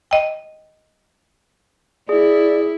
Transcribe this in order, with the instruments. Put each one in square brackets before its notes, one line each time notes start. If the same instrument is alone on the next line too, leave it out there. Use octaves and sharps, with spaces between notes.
[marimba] D#5 G5
[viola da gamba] E4 [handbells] G#4 [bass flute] D5